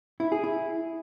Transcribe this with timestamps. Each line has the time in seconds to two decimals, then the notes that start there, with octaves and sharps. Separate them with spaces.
0.20 E4
0.32 G#4
0.44 E4